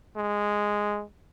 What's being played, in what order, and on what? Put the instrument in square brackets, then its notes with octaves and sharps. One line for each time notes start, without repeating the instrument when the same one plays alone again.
[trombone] G#3